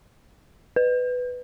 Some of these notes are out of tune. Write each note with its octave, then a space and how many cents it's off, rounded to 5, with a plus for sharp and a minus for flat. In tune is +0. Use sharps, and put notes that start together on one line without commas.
B4 +10